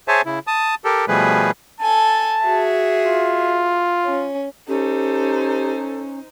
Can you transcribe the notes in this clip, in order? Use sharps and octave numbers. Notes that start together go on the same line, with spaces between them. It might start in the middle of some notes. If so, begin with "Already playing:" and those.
G#4 C5 C#5 E5 G#5 A5
C#3 E4
A5 D#6
G4 A4 A#4
B2 F3 G3 A3 G#4 B4
A4 G#5 A5
F#4 G#4 E5
F4
C#4
C#4 D#4 G4 A4 C5